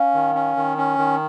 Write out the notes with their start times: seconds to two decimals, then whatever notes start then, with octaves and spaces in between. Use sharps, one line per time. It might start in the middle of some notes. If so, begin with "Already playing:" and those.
Already playing: C#4 F5
0.14 D#3
0.35 C#4
0.57 D#3
0.77 C#4
0.99 D#3